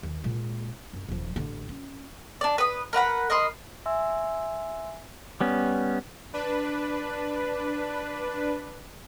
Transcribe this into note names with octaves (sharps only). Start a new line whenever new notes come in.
D#2
A#2 G#3
F#2
D#1 F3
A1 D3
C#4
D4 D5
B4 D#6
A#4 B4 F#5 B5
A#4 D#5 B5 C6
E5 G#5 C6 E6
G3 B3 C#4
D4 B4